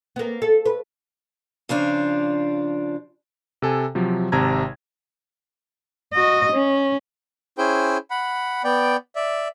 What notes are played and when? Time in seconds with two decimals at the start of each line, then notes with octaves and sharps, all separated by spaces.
0.16 A#3 B3
0.42 A4
0.66 B4
1.69 C#3 F3 D4 F4
3.62 C3 A4 G#5
3.95 C3 F3 F#3
4.32 G#1 C3 A5 A#5 G#6
6.13 F#4 D#5
6.52 C#4
7.58 C#4 E4 G#4 C5 G5
8.10 F#5 B5
8.64 B3 D5 G5
9.16 D5 E5